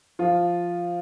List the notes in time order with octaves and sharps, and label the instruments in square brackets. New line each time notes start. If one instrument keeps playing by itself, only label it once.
[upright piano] F3 F4